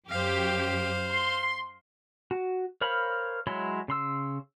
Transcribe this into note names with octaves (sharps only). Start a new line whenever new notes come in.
F#2 G4 C5 F5
C6
F#4
A#4 C5 C#5 F5 B5
F#3 G#3 E4 C#5 C6
C#3 C6 E6